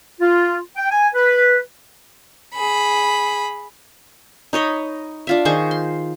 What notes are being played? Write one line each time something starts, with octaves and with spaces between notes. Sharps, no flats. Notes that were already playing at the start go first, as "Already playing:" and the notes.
F4
G5
G#5
B4
G#4 B5
D#4 C#5 D#5 B5
D4 F4 E5
D#3 G#4 C5 C#6
C6